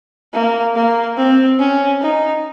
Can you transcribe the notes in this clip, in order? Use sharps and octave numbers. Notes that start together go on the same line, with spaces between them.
A#3
A#3
C4
C#4
D#4